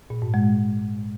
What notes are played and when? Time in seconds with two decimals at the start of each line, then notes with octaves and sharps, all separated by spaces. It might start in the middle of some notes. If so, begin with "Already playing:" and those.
0.10 A#2
0.22 G#2
0.34 G#3